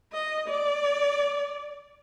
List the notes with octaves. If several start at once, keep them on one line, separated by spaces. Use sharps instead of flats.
D#5
D5